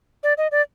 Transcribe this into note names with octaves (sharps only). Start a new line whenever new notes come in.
D5
D#5
D5